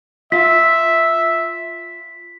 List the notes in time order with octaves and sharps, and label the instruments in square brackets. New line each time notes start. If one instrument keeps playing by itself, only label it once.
[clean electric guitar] F4 F5 [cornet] E5 [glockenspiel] B6